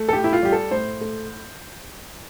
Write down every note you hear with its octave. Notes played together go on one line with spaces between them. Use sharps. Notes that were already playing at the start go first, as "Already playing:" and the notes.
Already playing: A3
A4
A2 G4
E4
F4
G3 G4
A4
A2 C5
A3